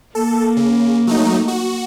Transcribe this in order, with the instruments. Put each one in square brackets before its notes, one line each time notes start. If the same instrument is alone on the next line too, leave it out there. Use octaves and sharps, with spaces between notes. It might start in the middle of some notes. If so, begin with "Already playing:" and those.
[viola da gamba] A#3 [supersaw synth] A4
[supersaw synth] C#3
F#3 A3 D#4
F#4